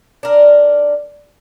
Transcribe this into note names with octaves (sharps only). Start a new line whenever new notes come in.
D4 A#4